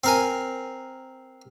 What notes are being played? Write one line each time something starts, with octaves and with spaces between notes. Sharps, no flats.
C4 A#4 G#5